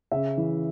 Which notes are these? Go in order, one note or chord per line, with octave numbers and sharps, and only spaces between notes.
C#3 E5
E3